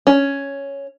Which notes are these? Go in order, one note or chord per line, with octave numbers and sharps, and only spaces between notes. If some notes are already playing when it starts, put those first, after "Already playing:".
C#4